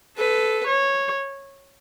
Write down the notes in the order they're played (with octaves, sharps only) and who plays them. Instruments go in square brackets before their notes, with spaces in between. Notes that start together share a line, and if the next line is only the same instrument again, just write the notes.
[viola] A4 [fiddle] B4
[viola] C#5